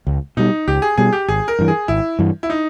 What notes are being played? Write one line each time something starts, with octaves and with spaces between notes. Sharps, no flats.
C#2
B2 G3 D#4
C#2 G4
G#4
B2 G3 G#4
G4
G#1 G#4
A#4
G2 E3
G#4
G#1 E4
G2 E3
E4
D#4